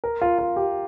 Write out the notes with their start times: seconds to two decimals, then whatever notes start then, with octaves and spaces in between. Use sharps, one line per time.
0.04 A#4
0.22 F4
0.39 F4
0.56 G4